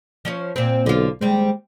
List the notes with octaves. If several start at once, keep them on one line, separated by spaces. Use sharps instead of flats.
F3 C#4 C#5
A#2 C4
B1 D3 F4
D#2 G3 G#3 C4